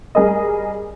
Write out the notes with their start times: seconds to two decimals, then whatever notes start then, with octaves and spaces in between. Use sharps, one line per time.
0.15 G3 G#4 A#4 D#5